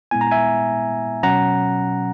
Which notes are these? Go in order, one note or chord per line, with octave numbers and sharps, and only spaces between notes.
A#2 G#3 B3 E4 G#5
A#5
E5 G#5
B2 F#3 C#4 F#5 A#5